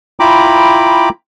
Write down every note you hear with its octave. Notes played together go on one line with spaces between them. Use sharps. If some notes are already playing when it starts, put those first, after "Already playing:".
E4 F4 G5 A#5 B5 D6